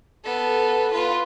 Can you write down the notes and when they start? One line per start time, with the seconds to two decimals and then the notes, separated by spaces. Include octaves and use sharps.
0.25 B3 A4
0.91 F4 B4